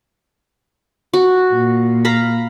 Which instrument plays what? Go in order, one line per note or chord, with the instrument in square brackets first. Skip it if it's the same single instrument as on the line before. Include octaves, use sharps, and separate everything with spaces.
[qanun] F#4
[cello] A#2
[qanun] F5 A#5 B5